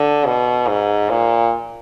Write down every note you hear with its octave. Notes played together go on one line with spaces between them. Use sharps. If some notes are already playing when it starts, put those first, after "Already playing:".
Already playing: D3
B2
G#2
A#2